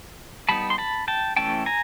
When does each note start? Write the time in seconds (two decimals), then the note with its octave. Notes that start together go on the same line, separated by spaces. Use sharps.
0.49 G3 B3 D#4 A5 B5
0.70 C6
0.78 A5 B5
1.08 G5 A5
1.36 E3 A3 C#4 E4 G5 A5
1.66 G#5 A#5